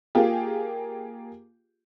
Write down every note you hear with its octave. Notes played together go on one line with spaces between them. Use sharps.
A#3 F4 G4 G#4